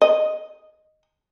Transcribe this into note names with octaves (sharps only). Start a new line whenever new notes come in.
D#5